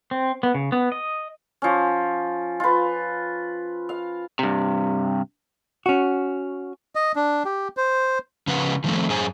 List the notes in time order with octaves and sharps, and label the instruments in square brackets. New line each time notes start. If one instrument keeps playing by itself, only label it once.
[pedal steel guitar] C4
B3
C#3
B3
D#5
[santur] F3 C#4
F4 B4
F5
[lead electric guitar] G2 C3
[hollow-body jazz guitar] C#4 F#4
[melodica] D#5
D4
G4
C5
[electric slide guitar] C#3 F3 B4 F#5
D#3 F3 A3 C4
F#2 C#4 G#4 C5 G#5